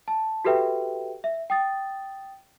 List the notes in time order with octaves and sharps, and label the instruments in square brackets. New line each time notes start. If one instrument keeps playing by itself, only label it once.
[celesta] A5
F#4 G4 A4 B4 E5 G5
E5
G5 D#6 A6